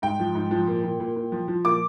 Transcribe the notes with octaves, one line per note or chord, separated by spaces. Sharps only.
G#2 G5
F3
G#2
F3
A#2
A#2
A#2
A#2
F3
F3
A#2 D6